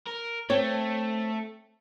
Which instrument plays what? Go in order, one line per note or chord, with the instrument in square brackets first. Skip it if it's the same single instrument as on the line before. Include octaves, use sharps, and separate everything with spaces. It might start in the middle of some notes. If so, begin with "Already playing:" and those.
[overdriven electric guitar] A#4
[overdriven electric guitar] A3 [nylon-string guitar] C4 C#5